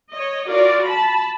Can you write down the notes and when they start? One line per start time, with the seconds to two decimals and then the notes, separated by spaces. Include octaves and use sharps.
0.11 C#5 D#5
0.46 F4 F#4 A#4 D5
0.84 A5 B5